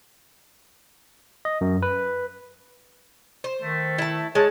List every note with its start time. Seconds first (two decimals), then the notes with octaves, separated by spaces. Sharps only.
1.45 D#5
1.61 F#2
1.82 B4
3.44 C5
3.62 D#3 A3
3.98 E4 A5
4.35 G#3 C#5 A5